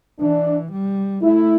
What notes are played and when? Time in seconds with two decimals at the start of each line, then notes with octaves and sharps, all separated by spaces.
0.20 E3 D4
0.72 G3
1.23 A3 E4